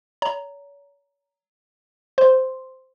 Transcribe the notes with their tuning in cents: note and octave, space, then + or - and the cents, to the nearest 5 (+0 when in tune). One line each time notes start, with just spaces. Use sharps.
C#5 +35 A#5 +0
C5 -10 C6 +0